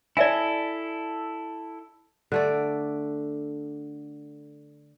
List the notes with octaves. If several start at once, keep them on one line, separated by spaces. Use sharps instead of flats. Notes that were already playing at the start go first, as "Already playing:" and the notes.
E4 A4 D5 E5 G#5
D3 A3 D5